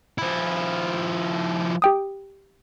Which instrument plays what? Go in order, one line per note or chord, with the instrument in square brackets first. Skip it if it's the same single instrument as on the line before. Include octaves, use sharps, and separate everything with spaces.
[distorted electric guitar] F3 E4
[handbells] G4 G5 D#6